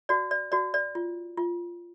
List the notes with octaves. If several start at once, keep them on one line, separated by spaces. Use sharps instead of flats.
F#4 D5
D5
F#4 D5
D5
F4
F4